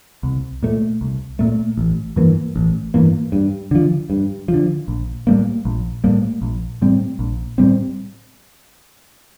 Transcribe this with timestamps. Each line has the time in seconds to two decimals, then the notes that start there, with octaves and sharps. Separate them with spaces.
0.23 C2
0.63 A#2 A3
1.01 C2
1.39 A#2 A3
1.77 A1
2.16 G2 E3 A#3
2.56 A1
2.94 G2 E3 A#3
3.32 G2
3.71 D3 F3
4.10 G2
4.48 F3
4.54 D3
4.88 A#1
5.27 A2 G3 A#3
5.65 A#1
6.04 A2 G3 A#3
6.42 A#1
6.82 A2 G3 C4
7.19 A#1
7.58 A2 G3 C4